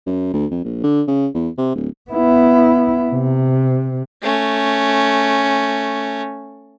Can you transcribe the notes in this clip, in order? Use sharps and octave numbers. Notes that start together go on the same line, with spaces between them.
F#2
D2
F2
A#1
D3
C#3
E2
C3
D1
B3 E4
C3
A3 C#4